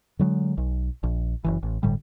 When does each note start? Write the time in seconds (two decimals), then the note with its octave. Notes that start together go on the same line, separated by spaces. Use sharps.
0.19 D3 F#3 G#3
0.57 B1
1.03 A#1
1.44 F#1 B1 E3
1.63 A1
1.83 G1 A2 D3 G3